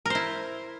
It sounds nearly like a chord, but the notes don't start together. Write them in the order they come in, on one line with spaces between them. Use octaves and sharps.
A#4 C5 E4